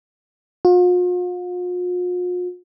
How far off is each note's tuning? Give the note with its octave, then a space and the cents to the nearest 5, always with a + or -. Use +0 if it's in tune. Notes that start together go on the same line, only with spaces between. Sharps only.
F4 +45